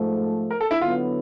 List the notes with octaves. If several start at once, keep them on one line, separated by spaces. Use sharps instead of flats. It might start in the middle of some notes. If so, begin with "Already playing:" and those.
Already playing: G#2 F3 A3
A#4
A4
E4
D3 F#3 B3 E4 F4